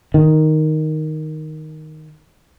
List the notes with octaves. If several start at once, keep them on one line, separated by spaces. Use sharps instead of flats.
D#3